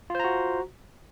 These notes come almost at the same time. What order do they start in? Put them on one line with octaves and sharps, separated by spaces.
F4 C5 A#5 F#4